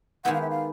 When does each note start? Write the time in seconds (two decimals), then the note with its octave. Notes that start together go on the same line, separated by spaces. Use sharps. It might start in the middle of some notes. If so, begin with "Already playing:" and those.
0.25 D#3 G#3 B3 E4 G4 F#5
0.34 F5
0.41 E5
0.50 F5